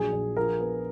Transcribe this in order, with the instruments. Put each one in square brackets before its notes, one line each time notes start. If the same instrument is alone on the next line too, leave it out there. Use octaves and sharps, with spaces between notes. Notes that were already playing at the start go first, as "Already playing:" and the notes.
Already playing: [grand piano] A#1 F#3 [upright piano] G#4
[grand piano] A#1
[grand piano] F3 [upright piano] A#4
[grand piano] B3